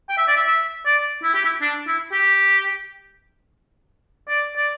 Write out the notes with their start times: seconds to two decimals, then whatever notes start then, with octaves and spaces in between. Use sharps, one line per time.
0.09 G5
0.18 E5
0.28 D5
0.37 E5
0.47 E5
0.85 D5
1.24 E4
1.34 G4
1.45 E4
1.61 D4
1.88 E4
2.12 G4
4.28 D5
4.57 D5